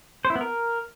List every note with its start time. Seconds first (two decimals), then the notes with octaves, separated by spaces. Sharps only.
0.25 C5
0.30 E4
0.35 B3
0.41 A#4